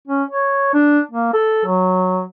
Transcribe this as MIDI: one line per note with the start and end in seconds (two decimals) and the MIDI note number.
0.08 0.23 61
0.31 0.70 73
0.74 1.00 62
1.11 1.32 58
1.34 1.63 69
1.65 2.23 54